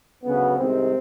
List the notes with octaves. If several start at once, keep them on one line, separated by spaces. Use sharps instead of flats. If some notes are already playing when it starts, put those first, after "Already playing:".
D2 C#3 F#3 B3
C2 C3 D#3 G#3 C4